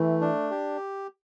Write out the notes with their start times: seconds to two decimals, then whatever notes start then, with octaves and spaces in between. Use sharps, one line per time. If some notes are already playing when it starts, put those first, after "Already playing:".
Already playing: E3 A3
0.21 D4
0.51 G4